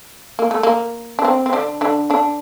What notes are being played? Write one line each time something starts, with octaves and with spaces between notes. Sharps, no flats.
A#3
A3
A#3
D4
C4
C4
D3 D4
D3 D4
D3 D4